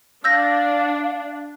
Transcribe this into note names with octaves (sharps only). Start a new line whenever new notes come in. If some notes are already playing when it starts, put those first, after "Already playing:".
D4 F5 E6 G6 A#6